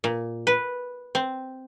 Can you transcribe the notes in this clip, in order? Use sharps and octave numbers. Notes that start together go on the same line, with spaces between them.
A#2
B4
C4